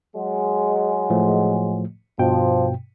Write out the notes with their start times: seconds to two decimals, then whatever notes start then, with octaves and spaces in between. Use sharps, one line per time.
0.15 F#3 G#3
1.10 A2 F3 A3
2.19 G2 B2 F3 G5